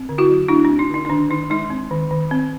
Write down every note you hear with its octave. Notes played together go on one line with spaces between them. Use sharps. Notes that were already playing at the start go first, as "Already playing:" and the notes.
Already playing: C4
D3
E4 F#4
F#3
A3 D4 E4
D4
C4
D#4
D3 D#4
D#4
D#3 D4
D#3 D#4
G#3 D#4
C4
D#3
D#3
C4